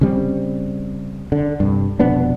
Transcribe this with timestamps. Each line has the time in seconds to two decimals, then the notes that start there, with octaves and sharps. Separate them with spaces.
0.01 C#3 G3 C4
1.32 D3
1.60 C2 G2
1.99 F1 B2 B3 D4